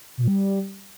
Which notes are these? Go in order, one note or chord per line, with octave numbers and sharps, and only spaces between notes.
B2
A#2
G3